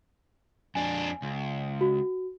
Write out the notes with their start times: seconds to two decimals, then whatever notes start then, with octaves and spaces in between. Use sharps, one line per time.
0.75 F2 D4 G#5
1.22 C#2
1.81 F#4